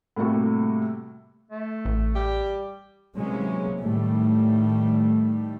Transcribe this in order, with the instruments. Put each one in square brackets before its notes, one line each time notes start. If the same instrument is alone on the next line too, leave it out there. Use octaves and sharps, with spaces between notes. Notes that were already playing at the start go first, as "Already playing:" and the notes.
[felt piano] A2 C3 G3 A#3 F#4 A4
[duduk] A3
[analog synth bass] A1
[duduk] G3 [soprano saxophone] G4
[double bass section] C3 E3 F#3 G#3 A#3 C#4
A2 D#3 G3 A3